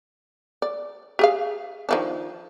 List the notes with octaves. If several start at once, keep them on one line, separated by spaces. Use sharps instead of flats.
D5
G4 G#4 F5
D#3 F3 D4